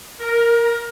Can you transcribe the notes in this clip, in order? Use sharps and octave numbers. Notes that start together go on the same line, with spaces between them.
A#4